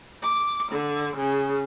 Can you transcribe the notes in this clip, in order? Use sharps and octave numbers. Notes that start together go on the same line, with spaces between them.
D6
D3
C#3